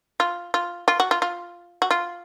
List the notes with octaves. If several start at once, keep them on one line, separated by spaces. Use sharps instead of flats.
F4
F4
F4
F#4
F4
F4
F#4
F4